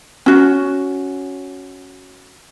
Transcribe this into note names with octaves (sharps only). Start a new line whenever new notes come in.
C#4 F#4